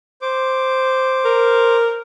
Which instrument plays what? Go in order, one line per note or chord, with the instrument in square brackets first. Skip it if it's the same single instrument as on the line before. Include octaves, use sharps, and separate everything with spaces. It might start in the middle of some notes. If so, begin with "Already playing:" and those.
[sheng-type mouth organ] C5 D6
[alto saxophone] A#4